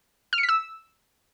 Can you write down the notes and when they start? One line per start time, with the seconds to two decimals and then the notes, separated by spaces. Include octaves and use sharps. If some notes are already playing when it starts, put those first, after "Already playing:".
0.33 F6
0.38 C#7
0.43 B6
0.49 E6